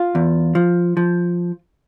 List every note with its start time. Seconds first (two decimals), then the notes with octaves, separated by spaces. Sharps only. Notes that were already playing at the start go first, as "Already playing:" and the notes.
Already playing: F4
0.15 E2
0.55 F3
0.97 F3